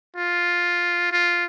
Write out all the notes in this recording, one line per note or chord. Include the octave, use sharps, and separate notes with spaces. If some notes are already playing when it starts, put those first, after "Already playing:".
F4
F4